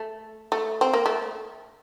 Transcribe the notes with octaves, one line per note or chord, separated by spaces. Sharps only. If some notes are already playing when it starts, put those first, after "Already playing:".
Already playing: A3
A3
C4
A#3
A3